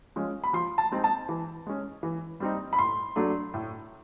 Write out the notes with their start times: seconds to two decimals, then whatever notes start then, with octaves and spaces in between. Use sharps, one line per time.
0.16 F3 G#3 C#4
0.44 B5
0.53 F3 C6
0.78 A5
0.92 G#3 C4 D#4
1.04 A5
1.29 E3
1.67 G#3 C#4
2.03 E3
2.40 G3 C4 D#4
2.73 B5
2.79 A2 C6
3.16 F#3 A3 D4
3.54 A2